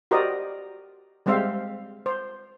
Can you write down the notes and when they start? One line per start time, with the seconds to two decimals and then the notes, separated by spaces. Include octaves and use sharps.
0.11 F#4 G4 A#4 C5 D5 D#5
1.26 G3 G#3 C4 C5 E5 F5
2.06 C5